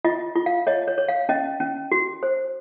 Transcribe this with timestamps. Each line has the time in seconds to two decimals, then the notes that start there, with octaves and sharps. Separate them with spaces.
0.05 F4 D#5
0.36 F4
0.46 F5
0.67 C#5 D#5
0.88 C#5
0.98 C#5
1.08 F5
1.29 C#4 D#5
1.60 C#4
1.92 F#4
2.23 C5